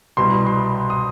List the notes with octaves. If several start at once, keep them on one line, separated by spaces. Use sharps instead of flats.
C2 B2 G3 C6
C6
D#6